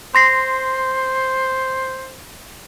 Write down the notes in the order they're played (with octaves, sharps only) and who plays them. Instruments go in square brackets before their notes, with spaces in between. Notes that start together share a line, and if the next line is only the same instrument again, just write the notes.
[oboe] C5 [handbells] C6 A#6 C7